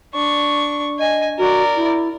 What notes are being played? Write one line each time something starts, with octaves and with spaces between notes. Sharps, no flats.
D4 C#6
D#5 G#5
F#4 A#4 D5
E4